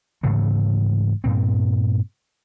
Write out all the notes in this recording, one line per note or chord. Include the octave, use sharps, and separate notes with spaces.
G#2 C#3 E3 A3
G2 A#2 C4